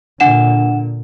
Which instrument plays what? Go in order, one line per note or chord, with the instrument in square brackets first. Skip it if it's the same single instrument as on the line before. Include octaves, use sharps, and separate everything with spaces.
[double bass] A#2 D3 [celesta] D4 F#5 E7